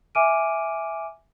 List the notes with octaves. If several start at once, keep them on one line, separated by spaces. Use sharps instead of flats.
E5 G#5 D6 F6 D7 D#7